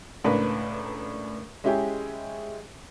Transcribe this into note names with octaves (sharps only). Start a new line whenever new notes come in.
C#2 A2 D4 A#4 B4
G#3 C#4 E4 G4 G#4